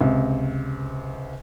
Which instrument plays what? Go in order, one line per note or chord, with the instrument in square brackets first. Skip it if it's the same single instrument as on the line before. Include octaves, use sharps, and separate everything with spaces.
[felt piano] C#2 C3